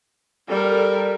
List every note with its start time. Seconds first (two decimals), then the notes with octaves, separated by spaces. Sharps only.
0.48 G3 A4 A#4